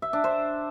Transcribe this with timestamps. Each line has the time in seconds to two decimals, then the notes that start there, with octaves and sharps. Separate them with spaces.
0.02 E5
0.13 D4
0.24 C5